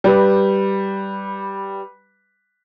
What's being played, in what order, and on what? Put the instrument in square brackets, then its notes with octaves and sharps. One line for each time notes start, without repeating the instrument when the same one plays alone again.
[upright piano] G3 B4